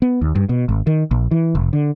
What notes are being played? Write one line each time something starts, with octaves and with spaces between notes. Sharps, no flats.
B3
D#2
G2
B2
G#1
D#3
A#1
E3
F1
D3